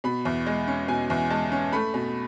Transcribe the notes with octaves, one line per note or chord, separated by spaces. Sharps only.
B2 B5
E2
G#3
C#4
B2 G#5
E2
G#3 A5
C#4
A3 B5
B2